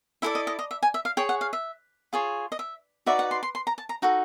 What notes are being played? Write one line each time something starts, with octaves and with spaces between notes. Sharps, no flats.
E4 A4 D5 E5
D#5
D#5
D#5
E5
G#5
E5
F5
G#4 C#5 G5
F#5
F5
E5
F4 G#4 C#5
D#5
E5
D#4 F#4 B4 D5 E5
F#5
C6
C6
C6
A#5
A5
A#5
D#4 F#4 A4